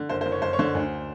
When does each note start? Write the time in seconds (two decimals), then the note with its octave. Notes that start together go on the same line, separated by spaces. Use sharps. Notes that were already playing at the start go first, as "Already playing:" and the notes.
Already playing: D3
0.09 F#1 C5
0.21 C5
0.26 F#1
0.32 C#5
0.42 F#1 C5
0.53 C#5
0.59 D3 C5
0.75 D2